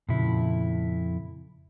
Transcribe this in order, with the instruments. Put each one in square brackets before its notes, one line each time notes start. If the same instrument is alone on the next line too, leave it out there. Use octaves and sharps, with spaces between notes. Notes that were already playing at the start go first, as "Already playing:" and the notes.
[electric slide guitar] F2 E4 [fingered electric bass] A#2 C#3